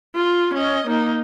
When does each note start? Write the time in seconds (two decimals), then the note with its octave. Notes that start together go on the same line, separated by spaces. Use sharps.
0.16 F4
0.54 C#4 D#5
0.88 A#3 D#4